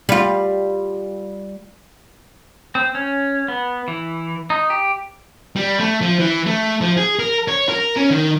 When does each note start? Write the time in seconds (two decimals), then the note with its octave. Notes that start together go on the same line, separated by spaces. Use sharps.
0.09 G3 F4
2.75 C4
2.95 C#4
3.48 B3
3.88 E3
4.50 D#4
4.70 G4
5.56 G3
5.80 A3
6.01 F3
6.19 E3
6.46 A3
6.81 F3
6.97 G#4
7.19 A#4
7.48 C#5
7.69 A#4
7.97 C#4
8.10 D#3